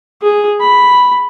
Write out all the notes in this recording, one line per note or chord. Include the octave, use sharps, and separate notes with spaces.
G#4
B5